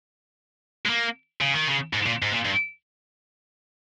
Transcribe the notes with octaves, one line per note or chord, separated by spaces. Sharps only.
G#3
A#3
C#3
D#3
C#3
G#2
A#2
G#2
A#2
G2